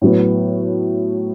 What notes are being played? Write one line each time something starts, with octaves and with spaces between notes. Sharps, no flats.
A2 F#3 B3